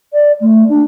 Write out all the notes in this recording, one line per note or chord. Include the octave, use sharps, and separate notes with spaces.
D5
A3
D4